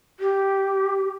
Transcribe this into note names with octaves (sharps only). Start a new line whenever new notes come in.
G4